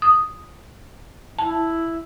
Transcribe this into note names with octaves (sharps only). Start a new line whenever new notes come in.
D#6
E4 A5